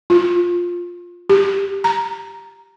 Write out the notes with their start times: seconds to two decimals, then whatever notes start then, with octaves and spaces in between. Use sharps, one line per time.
0.10 F4
1.30 G4
1.84 A#5